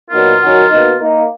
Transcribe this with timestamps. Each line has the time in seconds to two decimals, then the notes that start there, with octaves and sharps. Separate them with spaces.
0.10 A#2 F#3 B3 D#4 F4 A#4
0.40 D#3 F#3 C#4 F#4 A#4
0.69 B2 A#3 D#4
0.99 A#3 D#4 A#4